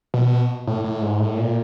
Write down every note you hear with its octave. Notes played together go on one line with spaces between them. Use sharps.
B2
A2
A2
G#2
A2
A#2